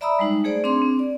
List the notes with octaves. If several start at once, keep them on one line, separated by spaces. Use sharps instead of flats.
D5 E5 A#5 B5 D#6 E6
G3 G#3 D#4
A3 G#4 C5 D5
C4 D4 G#4 C6
C4
D5